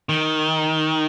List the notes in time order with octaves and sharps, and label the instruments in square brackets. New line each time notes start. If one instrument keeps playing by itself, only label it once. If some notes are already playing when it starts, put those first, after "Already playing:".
[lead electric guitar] D#3